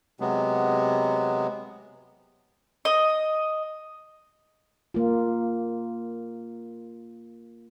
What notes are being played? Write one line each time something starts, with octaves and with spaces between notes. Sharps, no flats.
C3 F#3 G#3 B3
D#5
A#3 F4